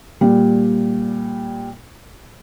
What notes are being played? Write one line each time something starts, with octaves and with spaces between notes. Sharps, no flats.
A#2 G3